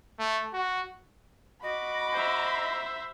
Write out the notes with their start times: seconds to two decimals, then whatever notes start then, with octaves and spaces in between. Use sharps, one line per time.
0.19 A3
0.54 F#4
1.62 F#4 D#5 B5 D6
2.13 C5 E5